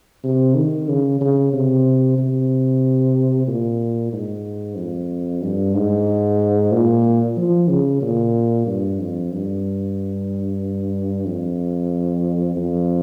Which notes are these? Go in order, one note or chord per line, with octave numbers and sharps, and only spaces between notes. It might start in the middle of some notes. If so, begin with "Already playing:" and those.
C3
D#3
C#3
C#3
C3
C3
A#2
G#2
F2
G2
G#2
A#2
F3
C#3
A#2
G2
F2
G2
F2
F2